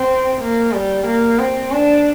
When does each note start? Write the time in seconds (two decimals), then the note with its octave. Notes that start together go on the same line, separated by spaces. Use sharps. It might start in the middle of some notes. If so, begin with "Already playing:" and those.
Already playing: C4
0.41 A#3
0.74 G3
1.06 A#3
1.39 C4
1.72 D4